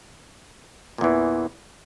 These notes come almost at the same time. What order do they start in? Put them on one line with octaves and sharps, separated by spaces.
A#2 E2 E3